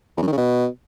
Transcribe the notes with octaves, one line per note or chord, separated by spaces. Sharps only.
E2
F#2
D#3
C#3
B2